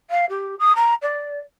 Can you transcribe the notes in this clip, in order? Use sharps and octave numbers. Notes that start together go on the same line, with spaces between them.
F5
G4
D#6
A#5
D5